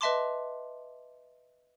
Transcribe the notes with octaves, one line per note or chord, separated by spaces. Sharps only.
B4 D#5 E5 A5 C6 D6